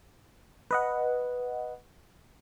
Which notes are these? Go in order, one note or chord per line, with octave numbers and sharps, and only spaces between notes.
B4 D#5 F#5